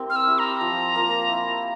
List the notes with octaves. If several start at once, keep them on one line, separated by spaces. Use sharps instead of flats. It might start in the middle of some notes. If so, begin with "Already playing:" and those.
Already playing: C4 E4 G4 A#4
F6
E6
E4 G4
A#5
F3
A#3 F4
E4